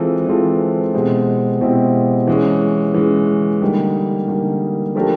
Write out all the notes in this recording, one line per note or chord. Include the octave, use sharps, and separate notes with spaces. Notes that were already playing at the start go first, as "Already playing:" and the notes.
Already playing: E3 G#3 C4 F4 A4
E3 G#3 C4 F4 A4
B2 G#3 C4 E4 G4
B2 G#3 C4 E4 G4
E3 G#3 C#4
E3 G#3 C#4
D3 G3 A#3 D#4
D3 G3 A#3 D#4
F3 A3 D4 G4 A#4